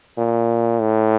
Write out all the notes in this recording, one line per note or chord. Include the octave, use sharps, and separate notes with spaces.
A#2
A2